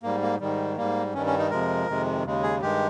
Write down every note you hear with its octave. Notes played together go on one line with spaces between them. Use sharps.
G#2 G3 A#3
A#3
G#2 D#3 G3
G#2 G3 A#3
G2 D#3 G3 C#4
C#4
D#4
F2 C3 F3 G#3 A#4
F2 C3 D#3 G#3
D#2 C#3 G#3
G#4
G2 D#3 G#3 G4